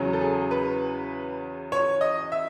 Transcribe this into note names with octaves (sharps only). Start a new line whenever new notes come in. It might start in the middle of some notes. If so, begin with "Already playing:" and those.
Already playing: E2 C#3 F#3
A4
G#4
B4
C#5
D#5
E5